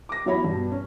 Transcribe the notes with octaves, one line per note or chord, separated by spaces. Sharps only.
D6 A#6
E2 F#3 E4 C#5 B5
G2 B2
C#4